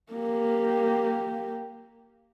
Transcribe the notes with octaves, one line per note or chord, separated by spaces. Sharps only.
A#3 G4